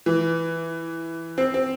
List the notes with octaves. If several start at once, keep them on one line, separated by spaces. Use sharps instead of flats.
E3
C4
C4